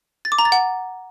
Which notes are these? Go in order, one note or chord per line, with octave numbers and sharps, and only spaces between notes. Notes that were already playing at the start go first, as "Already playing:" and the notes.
A6
D6
A#5
A6
F#5